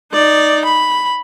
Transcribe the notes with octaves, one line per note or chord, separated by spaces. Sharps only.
D#4 D5
B5